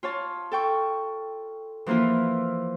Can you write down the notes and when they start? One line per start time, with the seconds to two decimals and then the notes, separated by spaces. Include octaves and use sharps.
0.03 F4 C#5 A5
0.51 A4 G5 C#6
1.86 E3 F3 A#3 E4 F4